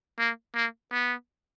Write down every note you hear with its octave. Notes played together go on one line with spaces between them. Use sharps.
A#3
A#3
B3